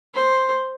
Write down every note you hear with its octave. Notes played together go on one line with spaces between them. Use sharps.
C5